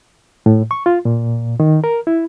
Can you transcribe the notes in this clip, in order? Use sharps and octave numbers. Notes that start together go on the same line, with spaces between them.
A2
C#6
F4
A#2
D#3
A#4
E4